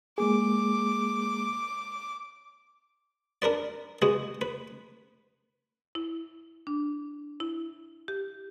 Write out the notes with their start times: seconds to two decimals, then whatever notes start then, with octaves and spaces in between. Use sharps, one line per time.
0.18 G#3 A#3 G#4 D6
3.42 D4 A#4 B4 D5
4.02 G#3 B3 F#4
4.41 B4
5.95 E4
6.67 D4
7.40 E4
8.08 G4